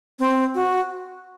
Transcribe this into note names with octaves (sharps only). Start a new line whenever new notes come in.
C4
F#4